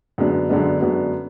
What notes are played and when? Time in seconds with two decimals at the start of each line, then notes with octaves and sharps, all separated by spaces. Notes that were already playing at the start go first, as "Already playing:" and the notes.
0.18 F#2 D3 G#3 B3 D4
0.49 F#2 D3 G#3 B3 D4
0.81 F#2 D3 G#3 B3 D4